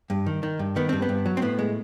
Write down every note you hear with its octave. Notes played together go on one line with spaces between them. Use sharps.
G2
D#3
D#3
G2
D#3 B3
G2 C4
B3
G2
F#3
C4
A2 B3
G#3